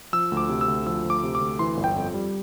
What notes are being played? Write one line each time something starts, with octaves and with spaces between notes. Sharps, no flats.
F3 E6
D2
D6
C3
E6
D2
F3 E6
D2
D6
C3
D6
D2
E3 C6
G1
G5
F2
G3